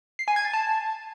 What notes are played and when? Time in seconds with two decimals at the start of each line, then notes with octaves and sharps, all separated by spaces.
0.19 C7
0.28 G#5
0.36 G#6
0.45 A6
0.53 A5